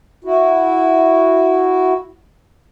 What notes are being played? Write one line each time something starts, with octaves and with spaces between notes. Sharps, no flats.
E4 F#4